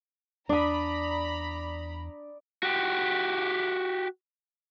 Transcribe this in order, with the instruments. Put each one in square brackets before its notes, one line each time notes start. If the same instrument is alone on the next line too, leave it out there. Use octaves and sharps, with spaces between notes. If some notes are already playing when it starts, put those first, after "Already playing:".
[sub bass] E2 [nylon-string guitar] D4 [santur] D5 D#6 [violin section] A#5 B5
[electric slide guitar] F#4 G4